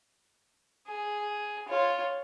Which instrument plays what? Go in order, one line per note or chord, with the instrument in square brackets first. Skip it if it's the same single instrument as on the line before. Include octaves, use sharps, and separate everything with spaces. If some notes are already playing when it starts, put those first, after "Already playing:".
[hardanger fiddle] G#4
F4 C#5